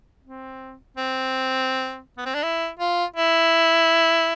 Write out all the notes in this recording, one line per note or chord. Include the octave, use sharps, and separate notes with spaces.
C4
C4
B3
C4
D4
E4
F4
E4